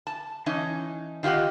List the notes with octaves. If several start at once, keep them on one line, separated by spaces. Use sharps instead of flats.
A5
E3 C#4 D#4
D#3 F4 G4 D#5 F#5